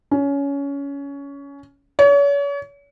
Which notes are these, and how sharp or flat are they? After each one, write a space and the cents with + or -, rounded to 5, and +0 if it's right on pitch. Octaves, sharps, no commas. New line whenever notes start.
C#4 +20
C#5 +40